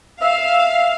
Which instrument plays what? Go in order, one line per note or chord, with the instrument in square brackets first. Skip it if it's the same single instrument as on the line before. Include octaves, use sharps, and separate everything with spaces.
[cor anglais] E5 [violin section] F5